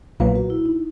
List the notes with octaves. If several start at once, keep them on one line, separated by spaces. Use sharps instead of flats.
B1 A#2 F#3 A#3 B4
F#4
E4
D#4